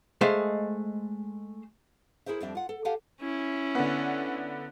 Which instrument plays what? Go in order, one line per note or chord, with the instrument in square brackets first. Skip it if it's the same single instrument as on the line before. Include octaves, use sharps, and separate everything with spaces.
[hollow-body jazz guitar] G#3 A3 C5 D#5 F5
[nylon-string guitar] E4 G#4 A#4 C5 E5
F2 F3 G3 C4 D4 E5
F4 F#5
A4
G4 F5 F#5 G#5 A5
[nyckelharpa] C#4 E4
[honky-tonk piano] D3 B3